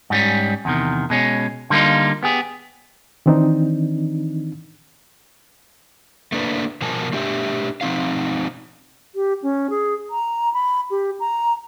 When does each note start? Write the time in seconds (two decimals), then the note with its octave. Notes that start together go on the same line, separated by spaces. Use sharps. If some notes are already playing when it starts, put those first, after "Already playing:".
0.10 G#2 G3 C#4
0.65 E2 C3 D#3
1.10 B2 G#3 C#4
1.70 D3 G3 A#3 D#4 F4
2.23 B3 G4 G#4
3.26 D#3 E3 C4 D4 D#4
6.32 A3 A#3 D4 B4
6.82 B2 F3 A#4 G#5 A5
7.13 A3 D4 G4 E5
7.81 F3 C4 D#4 F5
9.15 G4
9.42 C#4
9.70 G#4
10.10 A#5
10.53 B5
10.90 G4
11.20 A#5